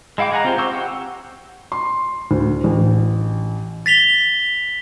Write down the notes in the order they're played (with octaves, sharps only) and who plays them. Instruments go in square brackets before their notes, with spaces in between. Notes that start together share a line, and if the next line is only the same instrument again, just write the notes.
[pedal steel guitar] G#3 E4 F5 G5 D6
G#4 D#5 F#5 G#5 A#5
C4 F4 G4 A#4 C5
C4 C5 C#6 D6 E6
G4 F#5 E6
[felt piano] C6
D2
A1
[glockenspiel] A6 B6 F7 G7